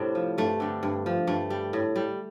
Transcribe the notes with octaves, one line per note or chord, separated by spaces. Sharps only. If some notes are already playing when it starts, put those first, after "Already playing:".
Already playing: A2 C3 G3 A3 C4 D4
F3
G2 A3
D3 G3
G2
F3
G2 A3
G3
A2
G3